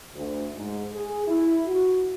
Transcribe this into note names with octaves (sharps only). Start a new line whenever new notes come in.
D2
G#2
G#4
E4
F#4